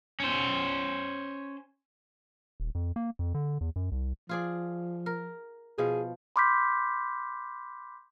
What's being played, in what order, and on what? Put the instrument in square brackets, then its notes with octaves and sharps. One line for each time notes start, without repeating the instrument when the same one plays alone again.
[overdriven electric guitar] C#4 C5
[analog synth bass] D#1
F2
A#3
F2
D3
E2
F#2
C2
[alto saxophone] F3 [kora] F4 G#4 D5
[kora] A#4
[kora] B2 F3 [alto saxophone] G#4
[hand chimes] B5 C6 D6 F6 G6 B6